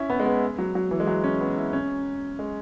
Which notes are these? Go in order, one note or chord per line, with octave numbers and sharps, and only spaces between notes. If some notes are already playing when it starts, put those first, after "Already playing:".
Already playing: C#4 E4
B3
G#3
B3
F#3
F#3
E3
G#3
F#3
C#4
B3
E4
C#4
G#3